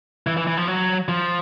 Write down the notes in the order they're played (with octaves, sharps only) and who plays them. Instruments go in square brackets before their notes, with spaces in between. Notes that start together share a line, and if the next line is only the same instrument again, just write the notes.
[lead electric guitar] E3
E3
E3
F3
F#3
F3